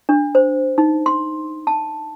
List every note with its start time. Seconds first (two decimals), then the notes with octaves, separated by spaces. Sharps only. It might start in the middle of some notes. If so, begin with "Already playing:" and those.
0.09 D4
0.35 C5
0.78 D#4
1.06 C6
1.67 A5